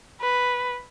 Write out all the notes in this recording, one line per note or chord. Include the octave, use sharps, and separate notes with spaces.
B4